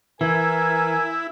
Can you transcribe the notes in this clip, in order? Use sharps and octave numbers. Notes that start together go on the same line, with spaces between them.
E3 E4 A#4 G#5